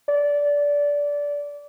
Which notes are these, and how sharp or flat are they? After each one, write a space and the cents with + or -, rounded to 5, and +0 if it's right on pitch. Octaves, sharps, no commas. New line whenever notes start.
D5 -20